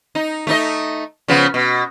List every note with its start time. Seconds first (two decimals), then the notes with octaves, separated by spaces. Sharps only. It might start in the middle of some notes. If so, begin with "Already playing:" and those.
0.15 D#4
0.47 A3 D#4 D#5
1.28 C#3 F3 B3
1.54 B2